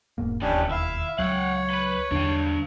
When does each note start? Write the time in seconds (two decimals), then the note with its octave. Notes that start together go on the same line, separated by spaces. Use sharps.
0.18 E1 G#2 A#3
0.42 E1 D#2 D#3 E3 C#4 D4 G4
0.71 E4 E5 F5
1.19 C#2 F#3 C#5 F5 F#5
1.70 B4 B5
2.12 E2 D3 G3 D4 F5